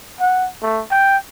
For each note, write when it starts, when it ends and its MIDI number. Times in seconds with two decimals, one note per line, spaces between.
0.20 0.47 78
0.62 0.83 57
0.91 1.17 79